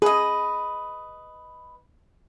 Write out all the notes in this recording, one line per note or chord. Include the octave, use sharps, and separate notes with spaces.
G#4 B4 D#5